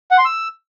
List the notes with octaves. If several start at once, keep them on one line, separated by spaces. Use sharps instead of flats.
F#5
C6
E6